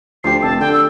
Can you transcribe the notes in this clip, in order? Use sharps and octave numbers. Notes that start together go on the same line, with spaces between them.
D2 F3 G4 C7
F1 E5 A5
D3 G5
E6